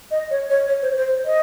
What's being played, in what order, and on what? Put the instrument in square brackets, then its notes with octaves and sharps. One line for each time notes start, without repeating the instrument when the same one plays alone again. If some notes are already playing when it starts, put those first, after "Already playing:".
[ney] D#5
C#5
C#5
C#5
C5
C5
D#5